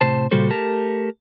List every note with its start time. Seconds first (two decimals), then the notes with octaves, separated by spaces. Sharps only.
0.01 A2 C3 C5 A5
0.31 A#2 C#3 G3 F#4 A4 C5
0.50 A3 G4 A#4 A5